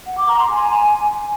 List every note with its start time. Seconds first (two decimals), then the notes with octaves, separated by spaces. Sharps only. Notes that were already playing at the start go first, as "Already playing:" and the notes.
0.07 F#5
0.18 D6
0.28 A#5
0.39 C6
0.50 G#5